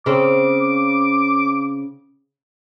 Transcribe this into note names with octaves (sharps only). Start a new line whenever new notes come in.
C#3 C4 D6